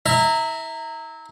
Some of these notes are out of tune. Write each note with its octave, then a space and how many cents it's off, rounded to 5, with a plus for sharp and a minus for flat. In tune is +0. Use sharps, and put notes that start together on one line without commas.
E4 -25 E5 +0 A#5 -20